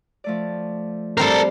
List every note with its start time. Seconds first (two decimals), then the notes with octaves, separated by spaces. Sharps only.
0.24 F3 A3 D5
1.17 G3 C4 A4 A#4 C5